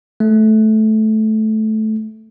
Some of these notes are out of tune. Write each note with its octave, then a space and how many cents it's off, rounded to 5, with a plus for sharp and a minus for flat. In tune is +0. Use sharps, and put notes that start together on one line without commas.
A3 -15